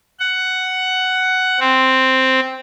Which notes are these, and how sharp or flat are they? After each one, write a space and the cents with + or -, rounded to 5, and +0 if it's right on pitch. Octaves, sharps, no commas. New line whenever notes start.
F#5 +10
C4 +0